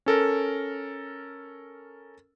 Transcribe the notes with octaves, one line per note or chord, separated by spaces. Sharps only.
C#4 A4 A#4